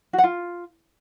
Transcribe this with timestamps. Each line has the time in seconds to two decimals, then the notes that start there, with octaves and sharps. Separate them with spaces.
0.13 F#4
0.18 F#5
0.24 F4